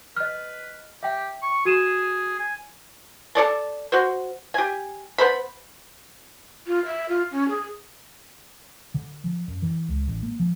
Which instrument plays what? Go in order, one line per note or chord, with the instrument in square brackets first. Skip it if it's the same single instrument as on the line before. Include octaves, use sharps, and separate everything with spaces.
[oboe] B4 [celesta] D#5 F6
[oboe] G4 [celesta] E5 G5
[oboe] C#6
[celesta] F#4 D#7 E7 [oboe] G#4
[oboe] G#5
[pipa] A4 D5 A5
F#4 C5
G4 G#5
B3 C5 B5
[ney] F4
E5
F4
C#4
G#4
[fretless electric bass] D3
F3
F#2
E3
C#2
A1
A#3
F3